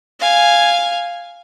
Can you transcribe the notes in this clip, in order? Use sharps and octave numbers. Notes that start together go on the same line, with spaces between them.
F5 G#5